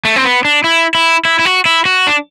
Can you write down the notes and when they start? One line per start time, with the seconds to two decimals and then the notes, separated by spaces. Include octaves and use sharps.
0.05 A3
0.16 C4
0.25 B3
0.45 D4
0.64 E4
0.95 E4
1.25 E4
1.39 E4
1.45 F#4
1.65 E4
1.85 F#4
2.07 D4